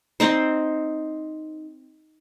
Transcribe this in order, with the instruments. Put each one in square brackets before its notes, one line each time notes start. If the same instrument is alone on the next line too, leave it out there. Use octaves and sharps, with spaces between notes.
[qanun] C4 D#4 C5